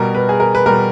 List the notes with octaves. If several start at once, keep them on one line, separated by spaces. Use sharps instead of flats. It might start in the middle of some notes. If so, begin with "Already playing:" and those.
Already playing: B2 G3 A#4
B4
G#4
A#4
B4
B2 G3 A#4